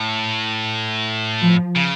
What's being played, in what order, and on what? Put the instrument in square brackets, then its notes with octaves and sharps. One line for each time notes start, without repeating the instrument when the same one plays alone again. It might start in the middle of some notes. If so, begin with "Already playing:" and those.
Already playing: [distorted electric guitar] A2
[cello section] F3
[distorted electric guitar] C#3